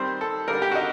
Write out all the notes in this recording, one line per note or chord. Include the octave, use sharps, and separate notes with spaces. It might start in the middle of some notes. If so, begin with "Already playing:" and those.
Already playing: D#3 G3 C4 C5
A4
D3 G3 A#3 A#4
G4
F#4
D#4